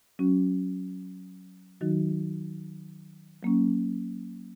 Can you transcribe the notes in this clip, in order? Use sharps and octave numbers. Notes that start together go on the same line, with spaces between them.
F#3 C#4 F#4
D#3 F#3 D#4 F#4
F#3 A#3 C#4